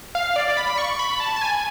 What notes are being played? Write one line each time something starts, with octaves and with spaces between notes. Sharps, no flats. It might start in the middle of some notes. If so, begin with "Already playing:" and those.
F5
D5
B5
C#6
B5
A5
A5
G#5